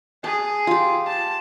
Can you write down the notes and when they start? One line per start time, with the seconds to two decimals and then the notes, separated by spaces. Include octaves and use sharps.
0.24 G#4 A5
0.67 F4 G4
1.07 A5